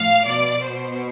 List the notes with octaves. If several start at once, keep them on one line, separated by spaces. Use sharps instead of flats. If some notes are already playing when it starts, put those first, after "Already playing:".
Already playing: A2 F3 F5
B2 D5
C5